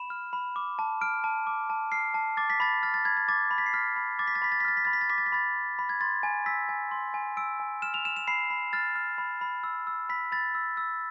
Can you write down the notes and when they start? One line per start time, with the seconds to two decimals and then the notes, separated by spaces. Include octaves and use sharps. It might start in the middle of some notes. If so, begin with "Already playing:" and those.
Already playing: B5 E7
0.10 F6
0.33 B5
0.56 D6
0.79 A5
1.01 F6 D7
1.24 A5
1.47 D6
1.70 A5
1.92 F6 C7
2.14 A5
2.37 D6 A6
2.50 B6
2.60 B5 A6
2.83 F6 A6
2.94 A6
3.05 B5 G#6
3.17 A6
3.28 D6 A6
3.51 B5
3.58 B6
3.66 C7
3.74 F6 B6
3.96 B5
4.19 D6 A6
4.27 B6
4.35 A6
4.42 B5 B6
4.52 A6
4.60 B6
4.65 F6 A6
4.77 B6
4.85 B5 A6
4.93 B6
5.01 A6
5.10 D6 B6
5.18 A6
5.26 B6
5.32 B5 A6
5.56 F6
5.79 B5
5.89 G#6
6.01 C6 A6
6.23 G#5
6.46 E6 B6
6.69 G#5
6.91 C6
7.14 G#5
7.37 E6 D7
7.60 G#5
7.82 F6 E7
7.94 F7
8.05 F6 E7
8.17 E7
8.28 B5 C7
8.50 B5
8.73 F6 A6
8.96 F6
9.18 B5
9.41 B5
9.64 E6
9.87 E6
10.09 B5 B6
10.32 B5 A6
10.55 E6
10.77 E6